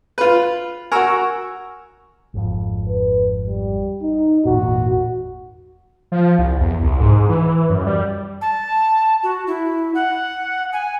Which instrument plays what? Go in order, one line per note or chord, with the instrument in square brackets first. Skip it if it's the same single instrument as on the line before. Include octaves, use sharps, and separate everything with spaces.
[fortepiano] F4 B4
[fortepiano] F#4 A#4 [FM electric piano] G#5 C#6 E6
[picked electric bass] G#1 F2
[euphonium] B4
G3
D#4
[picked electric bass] G#1 E2 A#2 [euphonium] F#4
[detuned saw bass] F3
C2
E2
C2
G#2
E3
F#2
G3
[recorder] A5
F#4
E4
F#5
G#5